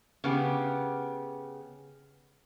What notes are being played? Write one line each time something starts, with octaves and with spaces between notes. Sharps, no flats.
C#3 B3 G4